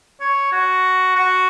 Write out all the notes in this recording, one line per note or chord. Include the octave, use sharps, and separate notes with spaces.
C#5
F#4
F#4